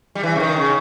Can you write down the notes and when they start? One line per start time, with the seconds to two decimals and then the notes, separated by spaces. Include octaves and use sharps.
0.15 G3
0.23 E3
0.36 C#3
0.40 D#3
0.57 C#3